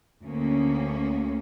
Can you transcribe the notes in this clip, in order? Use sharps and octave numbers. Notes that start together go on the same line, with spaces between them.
D2 A#3 C#4